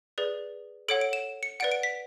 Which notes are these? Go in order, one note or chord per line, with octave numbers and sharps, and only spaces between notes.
G#4 B4 D5
A4 C#5 F#5 D7
D7
E7
C#7
B4 D5 F#5 D7
D7
B6